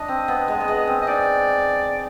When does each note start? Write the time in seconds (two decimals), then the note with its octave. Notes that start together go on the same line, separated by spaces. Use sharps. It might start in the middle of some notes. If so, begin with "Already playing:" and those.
Already playing: D4 D#5
0.08 C4
0.28 B3
0.48 G#3
0.60 B3
0.68 G#3
0.87 C4
1.02 D#5
1.07 D#4 D5